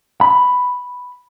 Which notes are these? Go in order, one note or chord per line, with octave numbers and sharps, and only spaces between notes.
B5